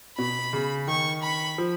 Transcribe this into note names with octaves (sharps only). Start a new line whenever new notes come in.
B2 B5
C#3
D#3 C#6
B5
F3